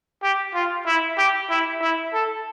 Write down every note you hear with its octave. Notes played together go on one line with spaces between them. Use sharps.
G4
F4
E4
G4
E4
E4
A4